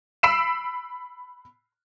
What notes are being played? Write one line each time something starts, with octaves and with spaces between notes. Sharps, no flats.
B5 E6 B6 C7 D7 E7